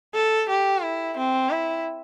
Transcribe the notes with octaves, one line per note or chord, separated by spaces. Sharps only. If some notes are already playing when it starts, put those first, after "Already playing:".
A4
G4
E4
C4
E4